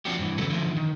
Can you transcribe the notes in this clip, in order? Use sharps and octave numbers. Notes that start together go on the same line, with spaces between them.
F3 C4 D4 F#4 G4
G2 E3
D3 F#3 A3 B3 C#4
D3 E3 F3
D#3